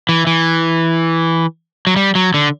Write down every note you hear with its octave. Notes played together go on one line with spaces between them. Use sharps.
E3
E3
F#3
G3
F#3
D3